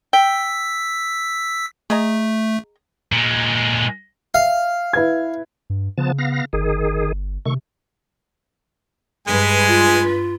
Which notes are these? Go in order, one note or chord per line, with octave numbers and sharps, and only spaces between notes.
G5 E6 B6
A3 G#4 D#5 A#5
A#2 G#3
E5 F5
E4 B4 G#6
G2
C#3 F3 B3 A5
B3 F5 A#6
G1 D#3 G#4
C3 D#3 A3 C#6
G2 G#3 B4 G#5
F4